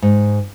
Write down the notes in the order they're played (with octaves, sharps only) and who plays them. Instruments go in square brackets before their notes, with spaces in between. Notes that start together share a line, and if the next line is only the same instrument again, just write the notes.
[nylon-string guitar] G#2